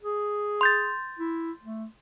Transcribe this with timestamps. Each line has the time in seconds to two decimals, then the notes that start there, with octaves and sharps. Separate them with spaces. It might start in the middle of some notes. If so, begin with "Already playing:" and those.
0.03 G#4
0.61 C6 G6 A6
1.19 E4
1.63 A3